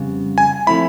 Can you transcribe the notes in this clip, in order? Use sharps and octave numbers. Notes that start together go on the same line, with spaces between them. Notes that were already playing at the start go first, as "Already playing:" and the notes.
Already playing: F2 C#3 G3 B3
G#5
F3 A3 C4 E4 B5